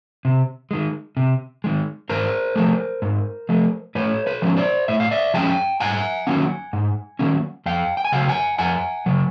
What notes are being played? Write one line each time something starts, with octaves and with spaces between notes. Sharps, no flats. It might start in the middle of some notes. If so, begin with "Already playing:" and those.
C3
D#3 G#3
C3
D#3 G#3
G#2 A#4 C5
F3 A3
G#2
F3 A3
A2 B4 C#5
B4 C#5
F3 G#3 C#4
C5 D5
A2 E5
F5
D5 E5
F3 G#3 C#4 G5 A5
G#2 F#5 G#5
D#3 F#3 A#3 C#4
G#2
D#3 F#3 A#3 C#4
F2 F5 G5
G5
G#5
C#3 F#3 F5 G5
F#5 G#5
F2 F#5 G#5
C#3 F#3